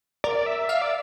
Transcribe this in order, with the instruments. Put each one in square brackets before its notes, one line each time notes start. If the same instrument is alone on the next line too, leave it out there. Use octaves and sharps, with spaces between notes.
[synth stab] A#4 [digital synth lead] D5
[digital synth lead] E5
[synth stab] E5 [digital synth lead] F5
[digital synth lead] D5